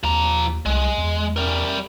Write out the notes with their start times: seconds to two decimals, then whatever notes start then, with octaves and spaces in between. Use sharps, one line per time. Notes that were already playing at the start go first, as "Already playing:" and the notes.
0.03 D#2 F3 A#5
0.66 C2 G#3
0.98 E2
1.36 G3 A#4